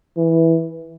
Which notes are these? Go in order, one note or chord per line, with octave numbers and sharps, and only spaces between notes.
E3